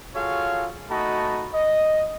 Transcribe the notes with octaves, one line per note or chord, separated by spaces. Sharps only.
F4 F#4 G#4 A4 C#5 F5
A3 D#4 F#4 D#5 A5 B5
D#5